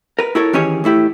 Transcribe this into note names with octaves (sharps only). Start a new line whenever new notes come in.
A#4 B4
E4 F#4 A4 A#4 C#5
D#3 E3 C#4 G4 G#4 C#5
A2 A3 E4 G4